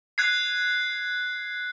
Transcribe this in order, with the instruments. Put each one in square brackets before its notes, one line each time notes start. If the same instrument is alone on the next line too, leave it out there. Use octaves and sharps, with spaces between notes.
[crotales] F#6 G#6 C7